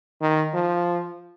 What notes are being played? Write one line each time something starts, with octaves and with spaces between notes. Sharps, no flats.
D#3
F3